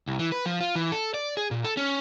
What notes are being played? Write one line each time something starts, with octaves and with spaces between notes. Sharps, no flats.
C2
E3
B4
F3
F4
E3
A4
D5
G#4
A#2
A4
C#4